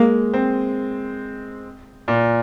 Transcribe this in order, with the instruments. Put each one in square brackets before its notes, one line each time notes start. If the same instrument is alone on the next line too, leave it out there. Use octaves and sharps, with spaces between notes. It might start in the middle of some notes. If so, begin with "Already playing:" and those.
Already playing: [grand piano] G#3 [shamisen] A#3
[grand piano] C4
A#2